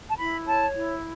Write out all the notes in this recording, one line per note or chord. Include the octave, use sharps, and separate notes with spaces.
A5
E4 B5
C#5 A5
E4